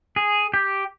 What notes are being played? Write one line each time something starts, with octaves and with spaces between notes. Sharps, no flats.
G#4
G4